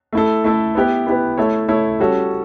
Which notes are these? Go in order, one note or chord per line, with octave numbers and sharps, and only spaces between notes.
A3 E4 A4
A3 E4 A4
B3 E4 G4 B4
B3 E4 G4 B4
A3 E4 A4 C#5
A3 E4 A4 C#5
G3 C#4 F#4 A4 C#5